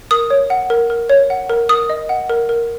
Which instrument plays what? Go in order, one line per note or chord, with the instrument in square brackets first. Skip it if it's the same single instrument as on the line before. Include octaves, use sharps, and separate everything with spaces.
[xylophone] A#4 D#6
C#5
F#5
A#4
A#4
C#5
F#5
A#4
A#4 D#6
D#5
F#5
A#4
A#4